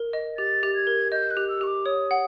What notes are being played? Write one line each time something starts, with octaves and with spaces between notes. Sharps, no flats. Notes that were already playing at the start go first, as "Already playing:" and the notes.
Already playing: A#4
D#5
G4 A6
G4
G#6
A#4
D#5 G6
F#6
G4
E6
G4 C#6
D6
C#5 D#6
F#5